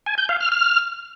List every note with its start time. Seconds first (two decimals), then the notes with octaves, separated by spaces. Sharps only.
0.06 G#5
0.18 G6
0.29 F5
0.40 F6
0.52 F6